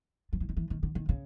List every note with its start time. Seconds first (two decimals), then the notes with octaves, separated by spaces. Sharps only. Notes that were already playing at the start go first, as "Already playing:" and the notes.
0.33 F3
0.40 E3
0.49 D#3
0.57 E3
0.70 D#3
0.83 D3
0.95 D#3
1.09 C#3